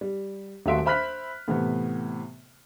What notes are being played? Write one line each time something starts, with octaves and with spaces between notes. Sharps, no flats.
G3
D#1 A3 F#4 E5 C6 D7
C5 E5 B5 F6 F#6 B6
A2 C3 E3 B3